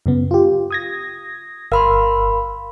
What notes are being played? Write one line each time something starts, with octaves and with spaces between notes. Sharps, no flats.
F#2 C#3 B3
F4 G4
D#6 G#6 A#6
G1 A#4 F5 B5 C6 E6